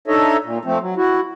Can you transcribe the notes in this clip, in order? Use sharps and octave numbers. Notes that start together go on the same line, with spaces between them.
D4 D#4 A4 C#5 D#5 E5
A#2
F3 A3 C4
F#3
E4 F#4